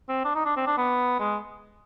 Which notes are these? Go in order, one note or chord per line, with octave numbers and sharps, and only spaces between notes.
C4
D4
D#4
D4
C4
D4
B3
G#3